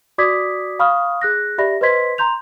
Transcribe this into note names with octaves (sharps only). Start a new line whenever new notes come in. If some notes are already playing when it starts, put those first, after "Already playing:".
F#4 D5 D6 D#6 G#6 B6
F5 B5 C#6 D#6 F6
G#4 F#6 A#6
G4 D5 E5 B5 A#6
B4 C5 D#5 C6 G#6 B6
A#5 C6 G6 F7